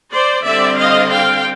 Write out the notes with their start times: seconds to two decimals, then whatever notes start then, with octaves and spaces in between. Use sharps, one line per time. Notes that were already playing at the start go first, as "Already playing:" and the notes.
0.13 C5 D5
0.46 D3 G3 C4 D5 E5
0.79 D#5 F5
1.12 F5 G5